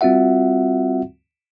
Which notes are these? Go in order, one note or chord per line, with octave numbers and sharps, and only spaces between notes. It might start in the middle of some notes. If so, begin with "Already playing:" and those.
G3 C4 F4 F#4 E5 F#5